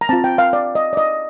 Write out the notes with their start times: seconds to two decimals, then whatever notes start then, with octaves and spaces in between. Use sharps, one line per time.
0.01 A#5
0.09 C4 F4 A5
0.24 G5
0.38 F5
0.53 D5
0.75 D#5
0.93 D5
0.97 D#5